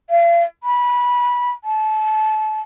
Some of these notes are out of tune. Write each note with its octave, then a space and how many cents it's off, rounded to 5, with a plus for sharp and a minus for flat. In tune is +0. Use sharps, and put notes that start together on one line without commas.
F5 -40
B5 -20
A5 -30